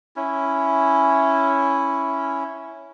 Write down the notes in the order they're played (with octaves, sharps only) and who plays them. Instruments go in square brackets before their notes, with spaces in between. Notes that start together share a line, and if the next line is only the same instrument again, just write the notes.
[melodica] C#4 E4